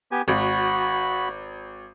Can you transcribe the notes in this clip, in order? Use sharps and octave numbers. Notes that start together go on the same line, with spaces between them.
B3 G4 G#5
G#1 F#4 B5